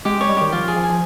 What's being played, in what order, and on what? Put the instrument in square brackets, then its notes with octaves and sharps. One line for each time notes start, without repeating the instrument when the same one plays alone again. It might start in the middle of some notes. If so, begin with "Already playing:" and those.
[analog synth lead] G#3 [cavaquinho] G4
[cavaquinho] C#5
[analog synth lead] G3
[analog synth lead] D#3 [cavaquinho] G4
[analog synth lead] F3 [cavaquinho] F4
[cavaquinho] G#4
[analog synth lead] F3
[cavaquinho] G#5
[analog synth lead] F3